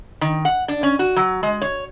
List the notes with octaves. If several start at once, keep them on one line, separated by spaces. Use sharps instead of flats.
D#3
F#5
D4
C#4
F#4
F#3
G#3
C#5